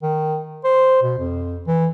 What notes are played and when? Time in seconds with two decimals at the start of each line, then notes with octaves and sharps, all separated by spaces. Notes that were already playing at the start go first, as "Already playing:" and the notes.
0.02 D#3
0.64 C5
1.02 B2
1.18 F2
1.67 E3